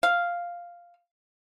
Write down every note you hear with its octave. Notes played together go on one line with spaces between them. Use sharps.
F5